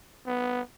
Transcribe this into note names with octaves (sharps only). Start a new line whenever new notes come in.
B3